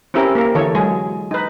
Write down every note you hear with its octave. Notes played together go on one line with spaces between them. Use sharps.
C4 C#4 E4 G4 A#4
A#3 A#4
D3 E3 A4 C#5
F#3 G#3 G#4
D#4 B4